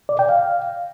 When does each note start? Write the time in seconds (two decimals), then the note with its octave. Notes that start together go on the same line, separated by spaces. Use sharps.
0.09 D5
0.19 G5
0.29 F5